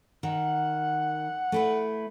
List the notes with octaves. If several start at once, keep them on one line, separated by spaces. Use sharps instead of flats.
D#3 F#5
A3 E4 B4